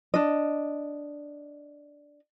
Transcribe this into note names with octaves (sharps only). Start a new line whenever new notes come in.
D4 D#5